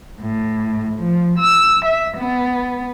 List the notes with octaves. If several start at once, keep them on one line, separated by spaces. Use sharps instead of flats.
A2
F3
E6
E5
B3